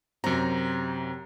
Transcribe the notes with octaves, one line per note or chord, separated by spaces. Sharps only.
F#2 C3 A#5